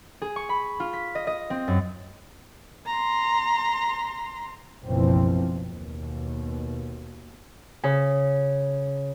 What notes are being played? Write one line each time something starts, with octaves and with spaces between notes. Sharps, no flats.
G#4
C#6
B5
F4
B6
D#5
D#5
C4
F#2
A#5 C6
F#1 B1 B2 E3 F3 C4
D#2 B2
C#3